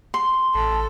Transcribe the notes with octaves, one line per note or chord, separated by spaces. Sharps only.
C6
A1 A4